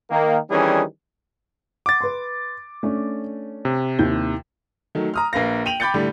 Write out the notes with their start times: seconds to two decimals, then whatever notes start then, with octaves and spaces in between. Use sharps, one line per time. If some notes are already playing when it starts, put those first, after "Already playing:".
0.11 D#3 A#3
0.50 D#3 E3 G3 C#4 D4 G#4
1.86 F#5 D6 A6
2.01 B4 C6
2.83 A3 C#4 D4
3.65 C3
3.99 D#2 E4 G6
4.95 D#3 F#3 A3
5.14 A#5 D#6 F6
5.33 A#1 A#3 B4 F5 A#6
5.66 G5 D#7 F7 F#7
5.80 G5 B5 D6 G6 A6 C#7
5.94 A2 D3 G3